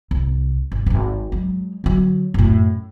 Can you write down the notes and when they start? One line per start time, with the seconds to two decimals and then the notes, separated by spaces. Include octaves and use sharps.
0.11 C2
0.72 G#1
0.86 D1 G#1
1.32 F#3 G#3
1.84 D3 F#3
2.34 F#2 A2